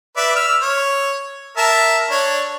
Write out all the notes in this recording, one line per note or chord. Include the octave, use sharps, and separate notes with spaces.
B4 D5 E5
E6 F6
C#5
A#4 E5 A5
D4 C#5